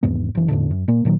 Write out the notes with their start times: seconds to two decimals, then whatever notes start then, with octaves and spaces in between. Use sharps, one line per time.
0.03 G#1 E2 G#2 B3
0.35 F#1 E3
0.48 E2 A2 D3
0.71 F#2
0.88 A#2 A#3
1.05 A#2 D#3 F#3